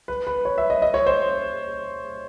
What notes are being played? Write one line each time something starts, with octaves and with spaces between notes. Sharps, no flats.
B4
B4
C#5
E5
D#5
D#5
C#5
C5